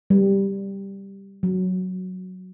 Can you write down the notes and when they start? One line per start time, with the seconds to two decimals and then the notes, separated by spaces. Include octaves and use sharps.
0.10 G3
1.43 F#3